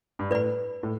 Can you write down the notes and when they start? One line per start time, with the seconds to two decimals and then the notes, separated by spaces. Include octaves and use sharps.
0.19 G2
0.30 A2 B4 D5 B5
0.83 A2